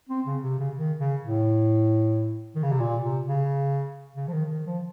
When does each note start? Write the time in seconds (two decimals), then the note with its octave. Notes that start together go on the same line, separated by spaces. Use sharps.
0.09 C4
0.26 C#3
0.43 C3
0.60 C#3
0.77 D#3
1.00 C#3
1.22 A2
2.56 D#3
2.63 C#3
2.72 C3
2.80 A#2
3.03 C3
3.25 C#3
4.16 C#3
4.28 F3
4.33 D#3
4.50 D#3
4.66 F3